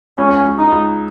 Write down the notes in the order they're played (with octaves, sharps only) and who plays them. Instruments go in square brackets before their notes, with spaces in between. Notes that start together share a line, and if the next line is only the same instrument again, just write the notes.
[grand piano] C#2 [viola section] C#4
[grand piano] C#2
[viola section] D#4
[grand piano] C#2